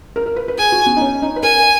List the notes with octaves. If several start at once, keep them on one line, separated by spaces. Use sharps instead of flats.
A#4
A#4
B4
B4
G#4 G#5
F#4
B3
D#4
C#4
D#4
B4
A#4 G#5